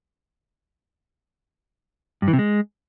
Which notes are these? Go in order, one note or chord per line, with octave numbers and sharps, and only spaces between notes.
G2
E3
C3
G#3